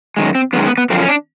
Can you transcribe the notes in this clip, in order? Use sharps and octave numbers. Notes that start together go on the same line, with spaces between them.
F#2 D#3 G#3
C4
F#2 D#3 G#3 B3
B3
B3
F#2 D3 F3 C4
C#4
D4